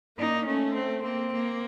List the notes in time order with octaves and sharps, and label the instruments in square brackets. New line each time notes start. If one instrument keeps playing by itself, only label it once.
[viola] A#3 [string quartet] D#4
[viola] A3 [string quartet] C#4
[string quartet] C4
[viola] A#3 [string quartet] C4
[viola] A#3